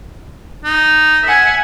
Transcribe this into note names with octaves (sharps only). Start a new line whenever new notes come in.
D#4
E5 F#5 G#5